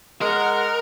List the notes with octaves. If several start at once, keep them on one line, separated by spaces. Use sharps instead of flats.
G#3 A#4 F#5 F6